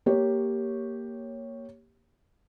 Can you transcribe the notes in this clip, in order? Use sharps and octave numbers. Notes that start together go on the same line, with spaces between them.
A#3 G4 C#5